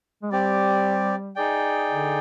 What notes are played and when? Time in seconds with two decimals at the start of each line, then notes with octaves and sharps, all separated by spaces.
0.22 G#3
0.31 G3 C4 G4 D5
1.36 D#4 G#4 D5 G5
1.88 D3